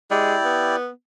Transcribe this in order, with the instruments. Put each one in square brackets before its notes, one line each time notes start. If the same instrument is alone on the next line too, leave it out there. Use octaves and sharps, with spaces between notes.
[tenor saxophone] G#3 [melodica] E4 G4 D5
[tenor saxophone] B3